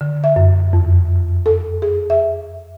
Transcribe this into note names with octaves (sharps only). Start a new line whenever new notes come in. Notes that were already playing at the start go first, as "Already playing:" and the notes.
D3
E5
F#2
F2
A4
G#4
E5